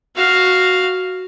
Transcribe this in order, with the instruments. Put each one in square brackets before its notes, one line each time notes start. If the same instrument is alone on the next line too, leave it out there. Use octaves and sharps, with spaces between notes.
[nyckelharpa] F#4 F5